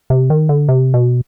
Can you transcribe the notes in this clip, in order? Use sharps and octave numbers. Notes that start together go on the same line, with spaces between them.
C3
D#3
D3
C3
B2